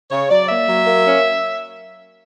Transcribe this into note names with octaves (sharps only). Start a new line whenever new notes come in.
C#3 C#5
F#3 D5
A#3 E5
F#3
A#3
C#4